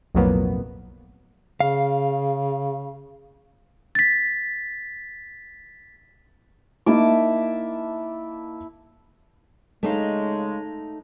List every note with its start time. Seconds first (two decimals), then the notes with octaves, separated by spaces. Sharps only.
0.15 B1 F2 A2 F#3 A#3 B3
1.60 C#3 F5
3.95 A6 B6
6.86 A#3 D#4 E4 A5 D6
9.83 C#3 G#3 A3 D#4 F5